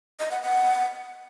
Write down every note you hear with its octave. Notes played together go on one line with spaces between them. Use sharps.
D#5
F#5
F#5